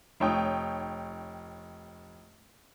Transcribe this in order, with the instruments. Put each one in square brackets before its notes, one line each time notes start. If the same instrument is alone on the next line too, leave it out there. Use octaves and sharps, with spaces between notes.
[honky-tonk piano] F1 C#5 G5 D#6